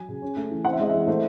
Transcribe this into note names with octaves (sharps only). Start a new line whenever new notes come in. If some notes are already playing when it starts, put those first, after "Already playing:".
Already playing: F#3 G#5
C#3
C#4
A3
E3
C4 F#5
E5
G#3 D#5
E3 E5
A3 C5